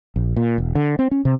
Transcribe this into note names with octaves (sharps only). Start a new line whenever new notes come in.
A#1
A#2
E1
D3
C4
C#4
C3